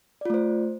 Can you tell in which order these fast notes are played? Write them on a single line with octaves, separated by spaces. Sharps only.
D5 F4 A3 C5